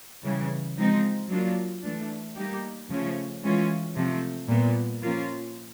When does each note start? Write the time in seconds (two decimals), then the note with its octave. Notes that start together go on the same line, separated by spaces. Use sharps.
0.24 C#3 E3 G3
0.77 F3 G#3 C4 D#4
1.30 F#3 A#3 D4 F4
1.83 E3 A3 D4
2.37 G3 A#3 D#4 G4
2.89 C#3 F3 A3 C#4
3.43 E3 G#3 C#4 F4
3.96 C3 F3 A3
4.48 A#2 G3 B3
5.02 F3 A#3 C#4 F4